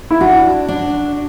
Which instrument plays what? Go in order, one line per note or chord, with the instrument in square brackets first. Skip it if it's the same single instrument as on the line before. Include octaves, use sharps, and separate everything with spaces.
[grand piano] E4
[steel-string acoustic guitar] D4 [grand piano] F#4
[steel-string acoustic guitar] D4